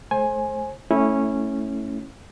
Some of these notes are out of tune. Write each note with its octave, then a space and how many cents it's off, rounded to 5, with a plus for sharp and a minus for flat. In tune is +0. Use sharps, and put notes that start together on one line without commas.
A3 -40 C5 +30 G#5 +0
A3 +5 C#4 -10 E4 -15